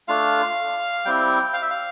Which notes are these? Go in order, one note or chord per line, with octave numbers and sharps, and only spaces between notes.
A3 D4 F4 F5
G3 C4 E4 G5
F5
E5
F5